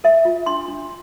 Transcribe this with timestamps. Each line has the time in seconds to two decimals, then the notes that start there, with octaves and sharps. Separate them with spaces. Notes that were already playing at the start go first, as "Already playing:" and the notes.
0.04 A#4 E5
0.25 F4
0.46 D4 C6
0.68 D4